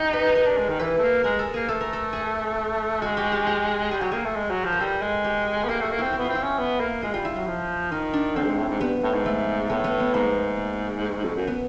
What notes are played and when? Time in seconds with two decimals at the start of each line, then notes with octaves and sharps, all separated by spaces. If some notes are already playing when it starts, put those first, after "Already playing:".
Already playing: C#4 D#4 G4
0.13 B4
0.35 D#4 A#4
0.46 D4
0.57 G#3
0.69 D#3
0.79 E3 B4
0.98 A3
1.02 A#3
1.24 G#3 A#4
1.39 A4
1.53 A#3 G#4
1.68 A3 A4
1.81 A#4
1.93 A4
2.13 G#4
3.02 G#3 F#4
3.17 G4
3.32 G4
3.47 G4
3.91 G3 G#4
4.01 F#3 G4
4.11 A#3 G#4
4.24 A3
4.35 G#3
4.50 F#3
4.65 F3
4.72 A#4
4.80 G3 A4
5.02 G#3
5.24 G4
5.64 B3
5.69 A#3 G4
5.81 A3 F#4
5.91 A#3
5.99 C4 E4
6.13 E4
6.18 B3
6.25 C4 F4
6.35 E4
6.43 C#4
6.58 B3
6.80 A#3
7.02 G#3 F4
7.14 G3 F4
7.25 E4
7.36 F#3 F4
7.47 F3
7.91 D#3 D#4
8.13 D4
8.36 D3 C4
8.43 G2
8.47 G#2
8.58 A2
8.69 G#2
8.80 G2 B3
9.03 A2
9.14 G#2
9.25 A3
9.69 A2 B3
9.84 B3
10.00 B3
10.14 G#2 A#3
11.24 F2
11.36 F#2
11.47 B3